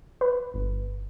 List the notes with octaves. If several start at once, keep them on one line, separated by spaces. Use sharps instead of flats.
B4
G1